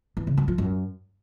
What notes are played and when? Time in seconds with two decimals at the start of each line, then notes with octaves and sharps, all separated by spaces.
0.17 E3
0.27 C#3
0.37 F#3
0.48 F3
0.58 F#2